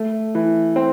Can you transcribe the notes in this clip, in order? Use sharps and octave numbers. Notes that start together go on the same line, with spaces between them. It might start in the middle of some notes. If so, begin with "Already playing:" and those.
Already playing: A3
E3
C4